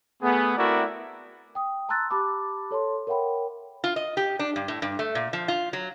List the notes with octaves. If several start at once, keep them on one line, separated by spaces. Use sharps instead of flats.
A3 B3 G#4
A3 C4 E4 F#4 A#4 D5
G5 D#6
A5 A#5 C6 E6 F#6 A6
G4 A5 B5 D6
A4 C#5 A5 C6
A#4 C#5 E5 F#5 G5 B5
F4
D#5
G4
D4
G2
A2
G2
A3
A#2
F3
F4
F#3